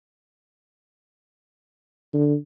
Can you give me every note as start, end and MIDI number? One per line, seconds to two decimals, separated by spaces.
2.14 2.35 50